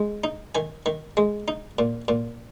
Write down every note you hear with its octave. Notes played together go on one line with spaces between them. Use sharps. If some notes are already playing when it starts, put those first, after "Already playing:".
Already playing: G#3
D#4
D#3 G#5
D#3
G#3
D#4
A#2
A#2